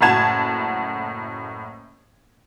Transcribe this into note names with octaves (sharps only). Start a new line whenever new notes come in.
F#1 A2 F#4 A5 G#6 E7